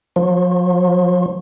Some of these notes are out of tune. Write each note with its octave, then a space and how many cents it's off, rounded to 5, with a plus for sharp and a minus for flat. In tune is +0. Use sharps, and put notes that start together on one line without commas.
F3 +40